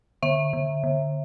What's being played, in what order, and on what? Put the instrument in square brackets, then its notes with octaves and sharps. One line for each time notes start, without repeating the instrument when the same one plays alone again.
[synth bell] D3 E5
D3
D3